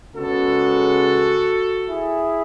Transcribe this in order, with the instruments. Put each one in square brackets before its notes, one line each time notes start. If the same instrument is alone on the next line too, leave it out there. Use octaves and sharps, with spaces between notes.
[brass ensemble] C#3 G#3 B3 F#4 A4
E4 G#4